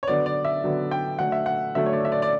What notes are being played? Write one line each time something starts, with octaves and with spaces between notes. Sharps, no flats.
C#5
D3 F#3 B3 D5
D5
E5
D3 F#3 B3
G5
D3 F#3 A3 F#5
E5
F#5
D3 F#3 A3 E5
C#5
D5
E5
D5
D5